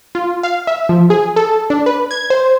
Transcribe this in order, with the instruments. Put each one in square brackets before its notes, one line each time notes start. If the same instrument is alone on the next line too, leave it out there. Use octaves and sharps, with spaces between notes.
[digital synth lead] F4
F5
E5
F3
G#4
A4
D4
B4
G#6
C5